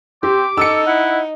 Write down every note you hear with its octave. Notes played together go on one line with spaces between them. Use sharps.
C4 G4 D6
D#4 A4 E6 C#7
E4 F#5